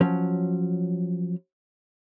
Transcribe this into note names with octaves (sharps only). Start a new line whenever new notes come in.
F3 F#3 C#4